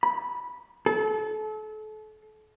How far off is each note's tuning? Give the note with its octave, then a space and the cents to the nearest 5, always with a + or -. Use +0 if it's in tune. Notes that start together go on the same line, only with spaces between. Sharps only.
B5 -10
A4 -35